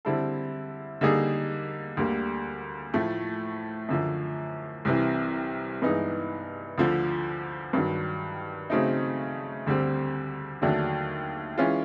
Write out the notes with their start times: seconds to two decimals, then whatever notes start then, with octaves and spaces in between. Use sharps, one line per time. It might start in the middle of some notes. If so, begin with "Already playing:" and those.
0.05 D3 G3 C4 E4 A4
1.01 D3 G3 A#3 D#4 G#4
1.97 D2 D3 G3 A#3
2.94 A2 F3 A3
3.89 F#2 D3 F3
4.85 C2 C3 E3
5.82 G2 E3 G#3 B3 D#4
6.78 D2 D3 F3
7.73 G2 D#3 F#3
8.70 C#3 F#3 A3 C4 D#4
9.67 D2 D3 G3 C4
10.62 D#2 D3 F#3 A3 D4
11.58 E3 G#3 C#4 F4